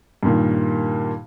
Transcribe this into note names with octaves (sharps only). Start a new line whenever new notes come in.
G2 A#2 D#3